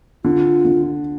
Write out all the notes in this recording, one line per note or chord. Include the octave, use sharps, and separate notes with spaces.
D3 F4
D3